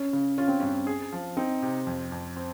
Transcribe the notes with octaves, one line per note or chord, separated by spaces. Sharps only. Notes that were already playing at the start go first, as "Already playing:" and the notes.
Already playing: C#4
C#3
C#4 F4
C4
G2 C#4
G#4
F3
C4 D#4
C3
F2
F2
C4